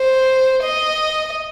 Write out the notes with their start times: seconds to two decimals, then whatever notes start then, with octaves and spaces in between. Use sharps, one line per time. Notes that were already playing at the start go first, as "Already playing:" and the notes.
Already playing: C5
0.63 D#5